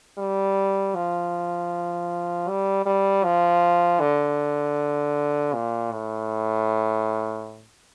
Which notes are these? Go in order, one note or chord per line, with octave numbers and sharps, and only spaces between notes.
G3
F3
G3
G3
F3
D3
A#2
A2